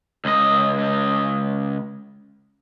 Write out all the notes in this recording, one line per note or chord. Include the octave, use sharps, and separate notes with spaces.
C#2 D#5